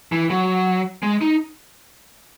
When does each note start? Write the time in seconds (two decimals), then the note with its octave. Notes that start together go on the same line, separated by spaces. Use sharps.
0.12 E3
0.30 F#3
1.03 G#3
1.21 D#4